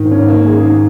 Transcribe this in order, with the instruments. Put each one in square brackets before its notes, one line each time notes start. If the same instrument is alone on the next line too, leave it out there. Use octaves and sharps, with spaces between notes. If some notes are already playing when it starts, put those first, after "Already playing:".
Already playing: [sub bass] G#2 [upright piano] D#3
[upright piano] C#4
A#3
G#4
D#3